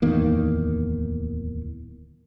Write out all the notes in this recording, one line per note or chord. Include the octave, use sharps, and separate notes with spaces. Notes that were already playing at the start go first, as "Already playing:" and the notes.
D1 E2 D#3 A#3